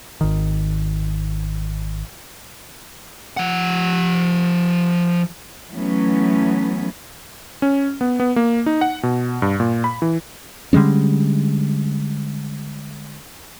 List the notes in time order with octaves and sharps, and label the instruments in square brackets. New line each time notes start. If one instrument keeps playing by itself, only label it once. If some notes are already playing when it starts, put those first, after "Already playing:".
[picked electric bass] G#1 D#3
[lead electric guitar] F3 F#5
[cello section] E3 F#3 A3 B3 C#4
[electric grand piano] C#4
B3
B3
A#3
D#4
F#5
B2
G2
A#2
B5
E3
[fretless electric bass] D3 G3 G#3 C#4